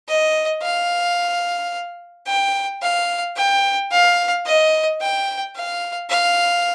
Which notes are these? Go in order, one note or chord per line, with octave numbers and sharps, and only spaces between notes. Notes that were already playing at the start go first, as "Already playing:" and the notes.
D#5
F5
G5
F5
G5
F5
D#5
G5
F5
F5